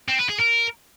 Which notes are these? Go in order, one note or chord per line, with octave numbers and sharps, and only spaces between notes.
C4
B4
G#4
A#4